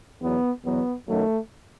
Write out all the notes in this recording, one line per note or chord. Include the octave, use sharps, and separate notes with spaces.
E2 B2 F#3 B3
E2 B2 F#3 B3
F#2 D#3 F#3 A3